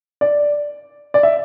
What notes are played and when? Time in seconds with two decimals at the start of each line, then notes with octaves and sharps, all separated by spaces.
0.21 D5
1.14 D5
1.23 E5